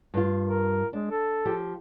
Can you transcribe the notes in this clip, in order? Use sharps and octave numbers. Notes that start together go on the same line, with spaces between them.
G2 F4
A#4
G#3 D4
A4
F3 G4